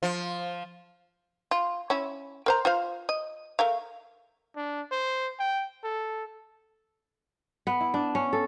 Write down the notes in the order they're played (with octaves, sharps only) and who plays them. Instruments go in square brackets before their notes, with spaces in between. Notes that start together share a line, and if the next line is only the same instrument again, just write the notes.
[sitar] F3
[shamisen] F4
C#4 E4
A#4 C5 A#5
F4 C5 F5
D#5
A3 A#4 F5
[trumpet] D4
C5
G5
A4
[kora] B3
E4
D4
C#4
A4